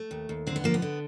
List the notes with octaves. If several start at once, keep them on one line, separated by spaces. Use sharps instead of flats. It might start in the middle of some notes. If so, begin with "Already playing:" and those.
Already playing: A3
D#2
D#2
D3 C4
B3
F3 A#3
B3
D3